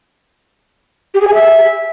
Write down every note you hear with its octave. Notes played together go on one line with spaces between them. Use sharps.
G4
G#4
G#5
E5